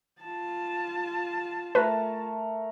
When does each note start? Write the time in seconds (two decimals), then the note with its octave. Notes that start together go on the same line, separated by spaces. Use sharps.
0.20 F4 A5
1.75 A3 A#4 B4